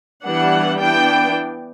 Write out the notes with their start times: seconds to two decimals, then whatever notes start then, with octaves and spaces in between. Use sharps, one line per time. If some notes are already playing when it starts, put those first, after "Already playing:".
0.24 E3 G3 B3 D4 F#5
0.78 E3 B3 D4 G5